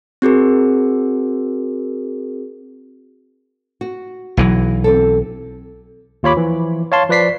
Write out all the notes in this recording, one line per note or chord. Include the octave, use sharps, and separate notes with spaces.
C4 F#4 G#4 A#4
F#4
B1 E3 F#3
C4 D4 A4
D#2 F4 C#5 B5 D6
E3 F3
C#5 F5 A5 C6
F3 B4 D5 B6 C7